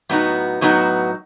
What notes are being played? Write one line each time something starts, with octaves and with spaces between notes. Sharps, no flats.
A2 F#3 B3 D#4 F#4
A2 F#3 B3 D#4 F#4